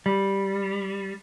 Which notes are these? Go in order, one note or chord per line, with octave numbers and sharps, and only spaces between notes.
G3